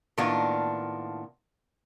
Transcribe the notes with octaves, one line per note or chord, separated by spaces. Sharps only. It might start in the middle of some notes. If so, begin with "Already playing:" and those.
A2 D#3 A#3 B3 D4 F4